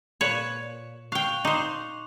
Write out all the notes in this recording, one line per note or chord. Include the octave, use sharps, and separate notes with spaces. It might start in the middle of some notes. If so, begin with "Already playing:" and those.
A#2 B4 C#5 E7
F5 G5 C#6 F#6 F7
D#4 C5 C6 D6 F#7